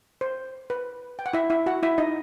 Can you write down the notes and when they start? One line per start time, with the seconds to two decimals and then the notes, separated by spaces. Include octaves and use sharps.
0.21 C5
0.70 B4
1.19 G5
1.26 F#5
1.33 E4 E5
1.50 E4 E5
1.66 F#4 F#5
1.83 E4 E5
1.98 D#4 D#5